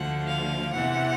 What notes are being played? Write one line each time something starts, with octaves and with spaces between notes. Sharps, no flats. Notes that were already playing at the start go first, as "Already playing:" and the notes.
Already playing: D2 D3 F3 F#5
F5
E2 C3 E3 F#5